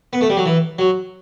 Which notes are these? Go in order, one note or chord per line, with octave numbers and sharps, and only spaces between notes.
B3
A3
G3
F#3
E3
F#3